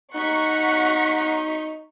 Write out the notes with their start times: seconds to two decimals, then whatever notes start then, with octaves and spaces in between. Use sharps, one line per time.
0.15 D#4 F#5 A#5 C#6 B6